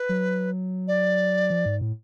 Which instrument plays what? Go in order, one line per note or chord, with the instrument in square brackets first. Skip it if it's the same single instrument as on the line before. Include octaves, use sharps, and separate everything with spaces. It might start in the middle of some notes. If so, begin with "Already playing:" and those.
Already playing: [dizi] B4
[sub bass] F#3
[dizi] D5
[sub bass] F3
G#2
A2